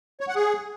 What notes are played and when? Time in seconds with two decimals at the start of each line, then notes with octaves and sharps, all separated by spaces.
0.21 C#5
0.28 F#5
0.36 G#4